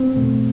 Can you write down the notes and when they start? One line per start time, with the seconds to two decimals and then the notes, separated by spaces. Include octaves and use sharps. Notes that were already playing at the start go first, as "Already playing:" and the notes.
Already playing: C4
0.15 E2 B2 A3